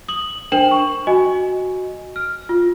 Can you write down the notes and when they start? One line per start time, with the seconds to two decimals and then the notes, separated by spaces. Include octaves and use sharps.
0.09 D#6 F#7
0.52 D4 A#4 C5 G5 E7 F#7
0.71 C#6
1.07 F#4 D#5 G#5
2.16 F6
2.49 F4